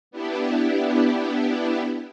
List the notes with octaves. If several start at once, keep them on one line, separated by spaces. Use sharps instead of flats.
B3 D4 E4 G4